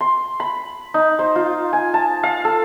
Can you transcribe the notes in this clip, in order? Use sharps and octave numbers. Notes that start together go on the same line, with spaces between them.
C6
B5
D#4
C5
F4
G#5
A5
F5
A4